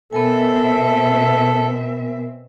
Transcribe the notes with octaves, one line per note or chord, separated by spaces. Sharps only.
B2 B3 C4 A4 A#4 E5 G#5